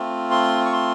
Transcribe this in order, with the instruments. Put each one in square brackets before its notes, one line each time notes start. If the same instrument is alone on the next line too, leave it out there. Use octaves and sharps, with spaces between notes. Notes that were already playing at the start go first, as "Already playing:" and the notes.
Already playing: [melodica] A3 C4 F4
C6
C#6
C6